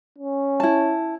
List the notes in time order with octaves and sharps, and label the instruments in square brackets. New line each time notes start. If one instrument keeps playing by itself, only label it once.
[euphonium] C#4
[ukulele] E4 A5